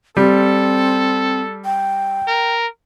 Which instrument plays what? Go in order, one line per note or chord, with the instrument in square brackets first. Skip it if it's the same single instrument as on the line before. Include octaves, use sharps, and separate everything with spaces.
[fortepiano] G3 [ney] C4 [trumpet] A4
[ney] G5
[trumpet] A#4